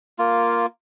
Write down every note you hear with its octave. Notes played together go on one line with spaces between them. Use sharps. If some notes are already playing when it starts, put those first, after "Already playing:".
A#3 F4